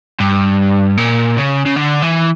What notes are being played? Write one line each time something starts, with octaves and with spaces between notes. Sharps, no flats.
G2
A#2
C#3
C#3
D3
E3